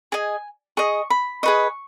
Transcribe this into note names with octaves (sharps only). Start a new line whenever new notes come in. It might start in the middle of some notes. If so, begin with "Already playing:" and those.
G#4 D#5 G#5
G#4 D#5 C#6
B5
G#4 B4 D#5 C#6